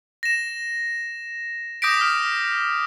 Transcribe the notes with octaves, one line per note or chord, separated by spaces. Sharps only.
A#6 E7
D6 D#6 G6 A#6 B6 D7
F6